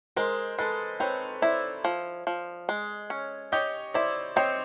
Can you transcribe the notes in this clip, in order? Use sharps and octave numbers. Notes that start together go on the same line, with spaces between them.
G#3 A#4 C5
G#3 A4 B4
C4 B4 C#5
E4 C5 D5
F3
F3
G#3
C#4
G4 C#5 D#5
E4 C5 D5
C4 C#5 D#5